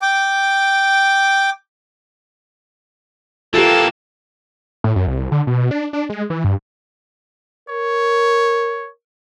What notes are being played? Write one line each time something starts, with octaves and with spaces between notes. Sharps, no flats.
G5 D6
E3 A#3 F4 G4 A4 A5
A2
F#2
C2
D3
B2
D4
D4
G#3
E3
G2
A#4 C#5